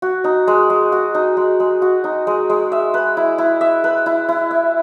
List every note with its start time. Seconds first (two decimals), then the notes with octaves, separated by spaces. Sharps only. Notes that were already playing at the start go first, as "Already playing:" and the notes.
0.02 F#4
0.24 D#4
0.47 G#3
0.70 G#3
0.92 F#4
1.14 D#4
1.37 G#3
1.60 G#3
1.82 F#4
2.04 D#4
2.27 G#3
2.49 G#3
2.72 E5
2.94 B4
3.17 E4
3.38 E4
3.61 E5
3.84 B4
4.06 E4
4.29 E4
4.51 E5